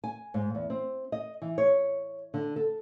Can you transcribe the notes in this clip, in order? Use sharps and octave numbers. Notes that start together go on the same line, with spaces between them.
G#5
G#2
E2
C4
D#5
E3
C#5
D3
A4